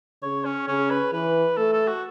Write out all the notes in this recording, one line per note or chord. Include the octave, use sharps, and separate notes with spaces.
C#3 C#5
C#4
C#3 C#4
B4
E3 B4
A3 A4
A4
F#4